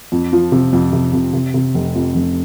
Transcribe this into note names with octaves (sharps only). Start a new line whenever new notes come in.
F2
F3
C3
F2
C3
C3
C3
C3
F1
F2
F1